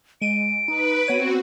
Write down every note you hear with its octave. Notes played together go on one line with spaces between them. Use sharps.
G#3 D7 D#7
D#4 B4
B3 C4 F#4 C#5 D#7